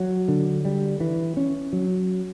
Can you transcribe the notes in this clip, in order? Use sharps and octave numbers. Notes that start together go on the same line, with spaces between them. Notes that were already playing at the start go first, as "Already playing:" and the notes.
Already playing: F#3
D3
G3
E3
C#4
F#3